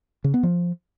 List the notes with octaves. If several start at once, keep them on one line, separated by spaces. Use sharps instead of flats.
C#3
B3
F3